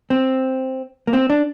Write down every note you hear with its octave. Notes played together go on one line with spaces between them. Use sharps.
C4
A#3
C4
D4